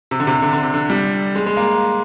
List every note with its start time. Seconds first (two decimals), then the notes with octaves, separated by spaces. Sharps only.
0.11 C3
0.20 D3
0.27 C3
0.42 D3
0.53 D3
0.63 C3
0.74 D3
0.90 G3
1.36 G#3
1.46 G#3
1.57 A#3